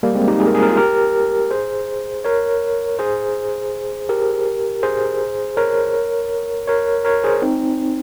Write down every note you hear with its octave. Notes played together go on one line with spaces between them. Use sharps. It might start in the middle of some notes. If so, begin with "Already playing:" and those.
G3 A#3
G#3 C4
D#4 G4
G#4
A#4
G#4
A#4
F4 G#4
G4 A#4
G#4 C5
A#4 C#5
G#4 C5
G4 A#4
G#4 C5
A#4 C#5
A#4 C#5
A#4 C#5
G#4 C5
C4 D#4